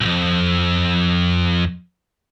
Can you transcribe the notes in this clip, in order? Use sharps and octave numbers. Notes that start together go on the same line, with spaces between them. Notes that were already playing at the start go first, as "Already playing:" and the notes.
B1 F2